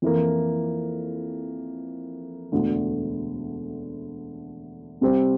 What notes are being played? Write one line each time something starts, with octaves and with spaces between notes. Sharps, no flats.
F2 E3 A#3
E1 D2 D3 A3
C2 C3 G3 C4